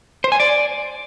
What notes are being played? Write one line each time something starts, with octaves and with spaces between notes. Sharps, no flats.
C5
G#5
D5